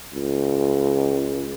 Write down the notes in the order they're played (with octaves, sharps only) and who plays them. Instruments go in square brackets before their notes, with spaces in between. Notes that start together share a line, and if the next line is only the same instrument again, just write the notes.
[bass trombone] C#2